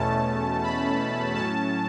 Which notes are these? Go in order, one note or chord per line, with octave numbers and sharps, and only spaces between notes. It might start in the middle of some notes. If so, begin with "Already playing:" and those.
Already playing: E2 B2 A3 C#4 A5
B5
A2 F#3 C#4 A5